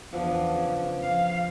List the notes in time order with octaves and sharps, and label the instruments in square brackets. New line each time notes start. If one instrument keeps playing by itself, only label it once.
[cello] E2 [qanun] F3 B3 D4
[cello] C#3
F2 F5